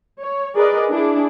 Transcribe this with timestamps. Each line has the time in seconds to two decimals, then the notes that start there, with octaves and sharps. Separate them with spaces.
0.20 C#5
0.54 G#4 A#4 B4 D5 D#5
0.90 D4 E4 G#4